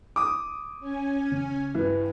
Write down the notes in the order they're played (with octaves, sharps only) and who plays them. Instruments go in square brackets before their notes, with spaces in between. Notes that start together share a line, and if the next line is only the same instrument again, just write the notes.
[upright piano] D6 D#6
[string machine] C#4 G#5
[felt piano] C#3
[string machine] G2 [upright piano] E3 [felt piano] E4 B4